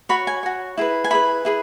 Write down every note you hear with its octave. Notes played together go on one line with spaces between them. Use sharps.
F#4 C#5 B5
G#5
F#4 C#5
E4 G#4 B4
G#5
E4 G#4 B4 B5
E4 G#4 B4